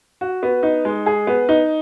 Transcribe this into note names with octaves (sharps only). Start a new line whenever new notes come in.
F#4
B3
D#4
G#3
G#4
B3
D#4